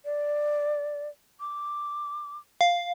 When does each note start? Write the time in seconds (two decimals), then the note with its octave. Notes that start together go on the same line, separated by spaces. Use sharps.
0.05 D5
1.40 D6
2.61 F5